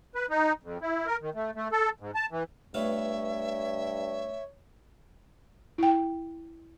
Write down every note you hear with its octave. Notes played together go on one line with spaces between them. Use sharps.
B4
D#4
F2
E4
A#4
D#3
A3
A3
A4
G#2
A5
E3
G2 A3 B3 F4 C#5 E5
E4 G5